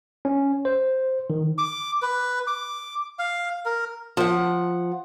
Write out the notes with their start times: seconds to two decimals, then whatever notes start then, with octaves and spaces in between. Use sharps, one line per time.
0.25 C#4
0.65 C5
1.30 D#3
1.58 D6
2.02 B4
2.47 D6
3.19 F5
3.65 A#4
4.17 F3 F#5